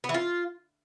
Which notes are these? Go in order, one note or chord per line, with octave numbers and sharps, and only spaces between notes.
B3
E3
F4